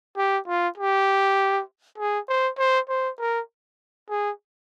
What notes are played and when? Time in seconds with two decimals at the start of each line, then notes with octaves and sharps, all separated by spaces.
0.17 G4
0.47 F4
0.78 G4
1.98 G#4
2.29 C5
2.59 C5
2.89 C5
3.19 A#4
4.10 G#4